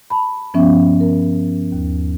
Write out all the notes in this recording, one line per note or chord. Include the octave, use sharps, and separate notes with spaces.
A5 B5
G2 F3 B3 C#4 E5
A#4
D#2